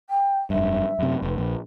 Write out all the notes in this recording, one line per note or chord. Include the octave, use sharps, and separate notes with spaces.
G5
F1 G2 E5
F#2 C3
F1 B4
A#1